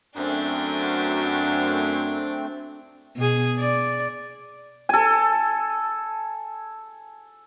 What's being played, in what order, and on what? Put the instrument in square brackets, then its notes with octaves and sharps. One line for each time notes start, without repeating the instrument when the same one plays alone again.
[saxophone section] F#2 [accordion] A3 C4 [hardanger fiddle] D4
[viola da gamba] B2 G#4
D5
[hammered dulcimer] A4 G#5